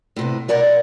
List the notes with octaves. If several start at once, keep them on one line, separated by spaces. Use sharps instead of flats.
A2 C3 B3
B2 A#4 D5 F#5 A#5